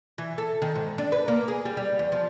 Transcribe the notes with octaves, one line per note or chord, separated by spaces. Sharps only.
E3
A4
D#3
G#2
D4
B4
A#3
G#4
G3
G3
E2
F3